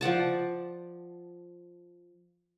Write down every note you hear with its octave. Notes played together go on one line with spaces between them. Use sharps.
F3 D5 F#5 A5